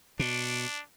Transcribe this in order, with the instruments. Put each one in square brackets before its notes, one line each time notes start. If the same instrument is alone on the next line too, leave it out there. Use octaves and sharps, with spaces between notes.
[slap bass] B2 [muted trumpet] D4